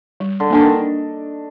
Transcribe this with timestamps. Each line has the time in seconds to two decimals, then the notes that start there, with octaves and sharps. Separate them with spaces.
0.20 G3
0.40 D3
0.50 D3 A#3 D4
0.60 D#3